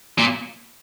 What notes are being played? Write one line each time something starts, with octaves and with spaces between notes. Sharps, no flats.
A#2